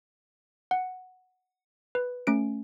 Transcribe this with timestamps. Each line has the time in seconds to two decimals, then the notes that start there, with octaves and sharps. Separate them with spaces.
0.71 F#5
1.95 B4
2.27 A3 C#4 D7